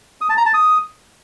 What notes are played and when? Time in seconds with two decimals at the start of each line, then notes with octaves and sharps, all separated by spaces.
0.21 D#6
0.29 A5
0.38 A#5
0.46 A5
0.54 D#6